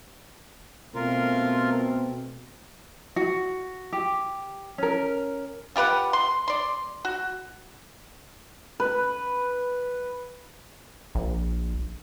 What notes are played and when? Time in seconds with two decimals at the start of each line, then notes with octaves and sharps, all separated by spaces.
0.95 B2 A3 C4 F4 A#4
3.16 F#4
3.93 G4
4.78 C#4 A#4
5.76 F4 G4 B4 F#5
6.13 C6
6.48 D5 C6
7.05 F#4
8.80 B4
11.15 A#1